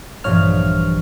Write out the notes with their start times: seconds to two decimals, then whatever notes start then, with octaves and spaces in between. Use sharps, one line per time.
0.24 A#1 G2 E3 F3 C#5 F6